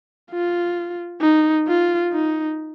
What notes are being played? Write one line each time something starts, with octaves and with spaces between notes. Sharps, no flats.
F4
D#4
F4
D#4